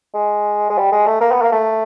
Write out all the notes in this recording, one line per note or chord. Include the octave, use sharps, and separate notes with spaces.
G#3
G#3
G3
G#3
A3
A#3
B3
A#3
A3